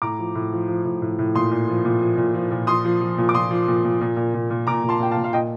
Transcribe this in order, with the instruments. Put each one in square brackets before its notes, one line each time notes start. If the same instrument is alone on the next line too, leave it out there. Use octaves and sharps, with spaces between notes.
[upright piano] A2 A#5 D6
F3
A2
F3
F3
A2
A2
A2
A#2 C6 D#6
A#2
F3
A#2
F3
A#2
F3
A#2
F3 C6 D#6
F3
F3
A#2
D6
A#2 C6 D#6
F3
A#2
A#2
A#2
A#2
A#2
A#2
A#2 A#5 D6
A#2
A5 C6
A#2 G5
F5 A5
A#2
F5
A#2 D#5 G5